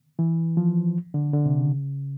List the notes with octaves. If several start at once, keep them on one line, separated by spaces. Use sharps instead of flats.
E3
F3
D3
D3
C3
C#3